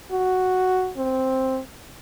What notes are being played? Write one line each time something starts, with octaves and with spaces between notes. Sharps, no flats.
F#4
C4